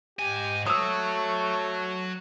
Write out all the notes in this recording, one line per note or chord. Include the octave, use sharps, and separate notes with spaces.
G#2 G4 G#5
F#3 A3 F#4 C#5 D#6 E6